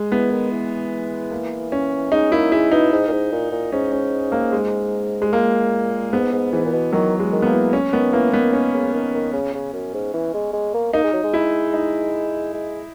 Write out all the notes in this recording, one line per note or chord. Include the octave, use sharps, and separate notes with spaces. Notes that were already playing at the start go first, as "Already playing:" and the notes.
Already playing: G#3
E3 B3
D#3
E3
A#3
C#4
G#3 D#4
A#3 E4
G#3 E4
B2 D#4
G#2
A#2
G#2
A#2
A#2
G#2 C#4
C#4
A#3
G#3
G#3
A#2 A#3
G#2 B3
G#2
G#2 E3
A#2
B2
D#3 F#3
G#3
D#3
B3
A#3
E3
C#4
D#3 B3
E3 A#3
D#3 B3
D#3 C#4
C#3
D#3
D#3
C#3
C#3
F#2
G#2
E3
G#3
G#3
A#3
A#3 D#4
G#3
F#3
G#3
E4
D#4
G#3